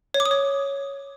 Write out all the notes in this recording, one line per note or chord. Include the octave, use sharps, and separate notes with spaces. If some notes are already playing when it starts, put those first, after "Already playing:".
C#5
D6
D#6
C#5